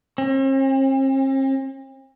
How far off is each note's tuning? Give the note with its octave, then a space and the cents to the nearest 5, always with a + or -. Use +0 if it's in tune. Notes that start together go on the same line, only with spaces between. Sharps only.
C4 +45